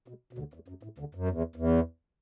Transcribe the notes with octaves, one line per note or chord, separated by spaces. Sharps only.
B2
B2
D2 D3
E2
F#2
A2
D2 D3
F#2
E2
E2